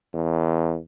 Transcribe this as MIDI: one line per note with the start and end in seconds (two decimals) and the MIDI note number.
0.14 0.77 40